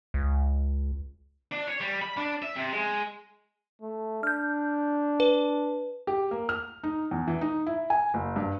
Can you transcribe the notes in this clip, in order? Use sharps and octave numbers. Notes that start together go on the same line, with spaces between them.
C#2
D4
C#5
G3
B5
D4
E5
C3
G#3
A3
D4 F6 G6
B4
G4
A#3
F6
D#4
E2
E3
D#4
E4
G#5
F#1
G2